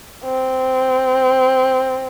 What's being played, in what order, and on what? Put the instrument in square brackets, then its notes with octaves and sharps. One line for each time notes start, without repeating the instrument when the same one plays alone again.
[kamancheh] C4